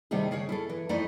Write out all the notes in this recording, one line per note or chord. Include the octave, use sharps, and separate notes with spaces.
C3 D#3 G3 A3 D#4 G#4
C#3 G#4 A#4 C#5
E4 G#4 A4
E3
F2 A3 D#4 E4 A4 D5